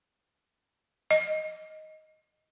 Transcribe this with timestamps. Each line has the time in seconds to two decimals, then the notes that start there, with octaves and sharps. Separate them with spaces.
1.11 D#5